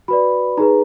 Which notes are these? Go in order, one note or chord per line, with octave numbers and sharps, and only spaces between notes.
F#4 B4 D5 B5
D#4 G#4 B4 A#5